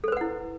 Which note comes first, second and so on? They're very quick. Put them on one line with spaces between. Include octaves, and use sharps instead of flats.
A4 C5 B4 F#5 E4